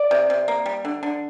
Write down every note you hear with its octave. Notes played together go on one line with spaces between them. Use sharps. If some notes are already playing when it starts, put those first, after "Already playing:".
Already playing: D5
C3
C3
A#3
G3
D3
D3